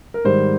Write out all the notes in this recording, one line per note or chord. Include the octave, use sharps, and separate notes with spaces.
A#4
G#2 D#3 G3 C5